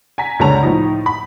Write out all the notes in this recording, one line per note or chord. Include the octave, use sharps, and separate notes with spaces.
G#5 A#5 B6
C#2 D3 C#5 A5 A#5 F7
A2 F3 D#4
B5